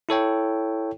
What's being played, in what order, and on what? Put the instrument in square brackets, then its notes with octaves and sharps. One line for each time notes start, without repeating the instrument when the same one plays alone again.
[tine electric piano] E4 A4 C#5 G5